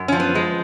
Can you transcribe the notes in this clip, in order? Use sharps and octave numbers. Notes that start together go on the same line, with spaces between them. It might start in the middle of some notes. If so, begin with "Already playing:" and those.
Already playing: F#2
F3 C#4
B3
G#3